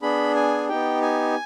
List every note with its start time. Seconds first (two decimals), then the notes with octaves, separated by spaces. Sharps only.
0.02 B3 D4 G#4 B5
0.35 G#5
0.69 B3 D#4 G4 G5
1.02 G#5